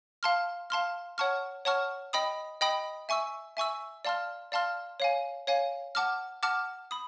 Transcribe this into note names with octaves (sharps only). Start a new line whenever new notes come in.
F5 A5 C6 F6
F5 A5 C6 F6
C#5 F#5 A5 C#6 F6
C#5 F#5 A5 C#6 F6
D#5 G5 B5 D#6
D#5 G5 B5 D#6
E5 G#5 C#6 E6
E5 G#5 C#6 E6
D5 F5 A5 C6 F6
D5 F5 A5 C6 F6
C#5 F5 G#5
C#5 F5 G#5
F#5 A5 D6 F6
F#5 A5 D6 F6
B5 D#6